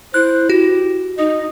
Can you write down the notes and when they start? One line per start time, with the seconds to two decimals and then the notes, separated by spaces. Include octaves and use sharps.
0.14 E4 C5 F#6
0.50 F#4 G4
1.18 D#4 D#5